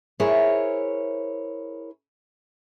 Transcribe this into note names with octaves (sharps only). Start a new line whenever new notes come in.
E4 G#4 A#4 C5 C#5